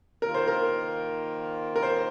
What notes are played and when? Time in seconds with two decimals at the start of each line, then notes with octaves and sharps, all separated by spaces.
0.22 D#3 A#3 F4 A#4
0.34 C5
0.48 A#4
1.76 A#4
1.83 C5